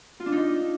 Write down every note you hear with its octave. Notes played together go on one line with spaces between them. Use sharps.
F4
D4
D#4